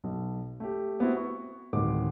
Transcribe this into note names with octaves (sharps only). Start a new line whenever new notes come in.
B1
A3 G4
B3 C4 E4 F#4
C#6
D1 D#3 G#3 D6